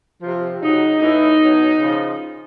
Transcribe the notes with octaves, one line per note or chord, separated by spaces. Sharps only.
C3 F3
C#3 F#3 D#4
A2 E3 D#4
B2 F#3
C#3 F3